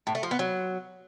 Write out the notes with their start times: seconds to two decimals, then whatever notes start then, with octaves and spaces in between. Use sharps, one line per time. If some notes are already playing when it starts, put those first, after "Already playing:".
0.07 A2
0.15 A3
0.23 F3
0.31 B3
0.39 F#3